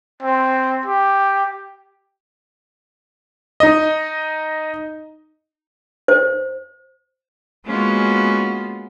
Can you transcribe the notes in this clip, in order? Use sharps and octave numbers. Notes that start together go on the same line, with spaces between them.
C4
G4
D#4 D#5
C5
G#3 A#3 B3 C#4 F4 F#4